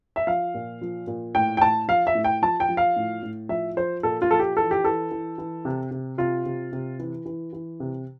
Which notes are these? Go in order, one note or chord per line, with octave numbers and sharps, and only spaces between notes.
E5
F3 F5
A#2
F3
A#2
A2 G5
G5
A2 A5
F3 F5
E5
A2
G5
F3 A5
G5
F3
F5
A2
A2
F3 E5
F3 C5
A#2 A4
F4
F3 A4
G4
E3 A4
G4
E3 A4
E3
E3
C3
C3
C3 F4
C3
C3
E3
E3
E3
C3